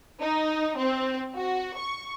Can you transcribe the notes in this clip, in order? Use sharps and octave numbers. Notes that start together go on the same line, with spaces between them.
D#4
C4
F#4
C#6